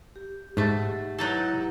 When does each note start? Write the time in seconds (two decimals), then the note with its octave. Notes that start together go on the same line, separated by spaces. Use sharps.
0.16 G4
0.57 G#2 B2 A3
1.19 F#3 D#4 E4 G4 A4 B4